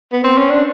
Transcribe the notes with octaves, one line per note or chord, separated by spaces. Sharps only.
B3
C4
C#4
D4